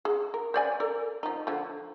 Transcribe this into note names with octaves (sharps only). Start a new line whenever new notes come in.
G#4
A#4
C5 D5 G#5
A4 A#4 D5
F3 D#4
D3 F3